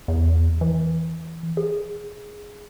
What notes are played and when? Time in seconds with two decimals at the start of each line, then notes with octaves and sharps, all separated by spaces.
0.08 E2
0.61 E3
1.57 G#4